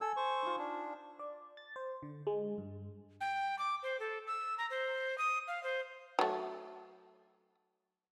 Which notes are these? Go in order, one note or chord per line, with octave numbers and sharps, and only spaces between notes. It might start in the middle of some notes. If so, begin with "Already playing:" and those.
A4 G#5 E6
C5 C#6
D#4 F4
D4
D5
A6
C5
D3
G#3
G2
G5
D6
C5
A4
E6
A#5
C5
D#6
F5
C5
F#3 A3